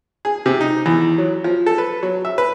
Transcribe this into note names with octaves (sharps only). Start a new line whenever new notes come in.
G#4
C3
D#4
E2
F#3
F3
A4
B4
F#3
E5
B4